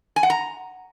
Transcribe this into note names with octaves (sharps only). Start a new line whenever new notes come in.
G#5
F#5
A#5